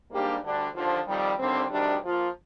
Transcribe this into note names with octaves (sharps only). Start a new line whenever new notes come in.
G#2 G3 A#3 D4 G4
D2 D3 G3 D4
D#2 D3 F3
F2 D#3 G3
D#2 D3 G3 C4
D2 C3 D#3 G3 D4
F3 A#3 F4